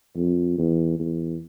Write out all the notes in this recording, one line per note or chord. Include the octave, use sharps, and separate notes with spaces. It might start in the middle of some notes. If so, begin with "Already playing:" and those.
F2
E2
E2